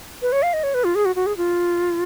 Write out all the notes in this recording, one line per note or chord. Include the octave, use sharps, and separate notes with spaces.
B4
C#5
F5
D#5
C#5
B4
F4
G#4
F#4
F#4
G#4
F4